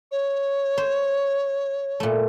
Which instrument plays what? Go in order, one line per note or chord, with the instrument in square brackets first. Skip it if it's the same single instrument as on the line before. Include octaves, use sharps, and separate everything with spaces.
[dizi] C#5
[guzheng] C5
A#2 A3